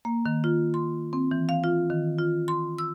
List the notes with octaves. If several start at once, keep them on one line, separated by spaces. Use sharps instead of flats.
A#3
D#3
F4
C6
C4
E3
F5
F4
D#3
F4
C6
E6